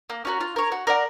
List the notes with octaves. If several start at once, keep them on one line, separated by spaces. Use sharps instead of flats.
A#3
C#4 F#4 A#4
F4
A#4 C#5
F#4
A#4 D5 F#5